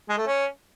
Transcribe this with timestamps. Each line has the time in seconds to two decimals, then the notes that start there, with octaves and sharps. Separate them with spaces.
0.09 G#3
0.18 A3
0.26 C#4